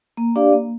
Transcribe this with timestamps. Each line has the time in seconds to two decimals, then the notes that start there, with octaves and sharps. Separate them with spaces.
0.17 A#3
0.36 D4 G4 D5 F5
0.53 A#3